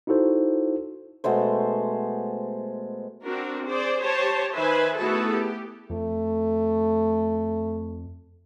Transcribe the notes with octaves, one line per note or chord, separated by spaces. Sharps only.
D#4 E4 F#4 A4 C5
B2 G#3 A3 C5
C4 D4 F#4 A#4
G#4 C5 D5
G4 C5 C#5 A5
D#3 B4 C5 E5 G#5
A3 B3 E4 F#4 G#4 A4
G4
F2 A3